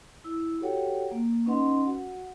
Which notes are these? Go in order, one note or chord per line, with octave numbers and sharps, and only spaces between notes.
E4 E6
F#4 G4 A4 C#5 F#5 G5
A#3
C#4 D#4 B4 D#5 F#5 C6
F#4 F#5